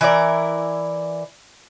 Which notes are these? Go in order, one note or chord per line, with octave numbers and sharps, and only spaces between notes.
E3 E4 A#4 D5